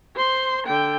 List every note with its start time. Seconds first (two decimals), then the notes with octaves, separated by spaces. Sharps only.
0.16 C5 C6
0.67 D3 G5